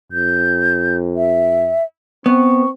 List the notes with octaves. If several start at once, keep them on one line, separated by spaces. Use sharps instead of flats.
F2 G6
E5
B3 C4 C#6